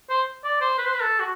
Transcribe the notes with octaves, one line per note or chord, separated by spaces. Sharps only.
C5
D5
C5
B4
C5
B4
A4
F#4